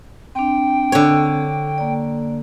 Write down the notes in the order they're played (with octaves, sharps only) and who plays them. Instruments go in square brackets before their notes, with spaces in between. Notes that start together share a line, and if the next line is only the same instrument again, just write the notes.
[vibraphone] C4 D4 [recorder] G5
[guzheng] D3 C#5
[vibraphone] A#3 D5